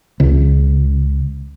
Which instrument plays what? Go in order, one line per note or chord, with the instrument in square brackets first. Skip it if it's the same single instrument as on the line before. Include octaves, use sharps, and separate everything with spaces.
[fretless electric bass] C#2